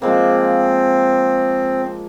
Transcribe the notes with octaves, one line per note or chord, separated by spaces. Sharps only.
F3 G#3 A#3 C4